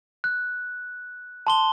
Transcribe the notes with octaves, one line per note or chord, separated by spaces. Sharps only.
F#6
A5 C6 G7